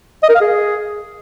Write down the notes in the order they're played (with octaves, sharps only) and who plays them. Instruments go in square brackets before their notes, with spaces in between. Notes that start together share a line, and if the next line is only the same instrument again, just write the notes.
[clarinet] D#5
A#4
F5
G#4